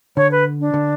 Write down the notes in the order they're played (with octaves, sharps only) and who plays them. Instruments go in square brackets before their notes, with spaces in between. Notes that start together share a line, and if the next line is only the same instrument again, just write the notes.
[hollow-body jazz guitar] D3 [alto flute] C#5
[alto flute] B4
D4
[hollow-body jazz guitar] D3